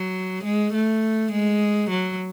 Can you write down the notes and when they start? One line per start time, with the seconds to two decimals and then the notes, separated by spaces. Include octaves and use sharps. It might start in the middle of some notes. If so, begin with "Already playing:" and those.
Already playing: F#3
0.44 G#3
0.73 A3
1.32 G#3
1.90 F#3